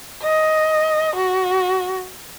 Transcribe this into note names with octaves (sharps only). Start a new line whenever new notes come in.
D#5
F#4